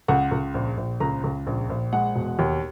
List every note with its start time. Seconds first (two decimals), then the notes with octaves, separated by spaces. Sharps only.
0.08 C#2 F#5
0.31 C#2
0.55 A#1
0.77 A#1
1.00 C#2 A#5
1.24 C#2
1.47 A#1
1.70 A#1
1.93 G#3 F#5
2.16 E1
2.39 D#2